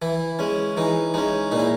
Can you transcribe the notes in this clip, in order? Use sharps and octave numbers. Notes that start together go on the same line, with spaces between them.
E3 E4
G#3 C#4
E3 D#4
G#3 C#4 D#4
A#2 D#4
E4